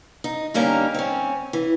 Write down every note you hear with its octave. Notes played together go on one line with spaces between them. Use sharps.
D#4
D3 G3 A#3 C#4 D#4
C4 C#4
E3